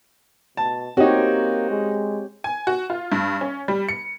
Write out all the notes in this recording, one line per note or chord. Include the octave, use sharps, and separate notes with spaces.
B2 A5
A#3 C4 D#4 F#4 G4 C#5
G#3
G#5
F#4
F4
G2
C#4
G3
C#7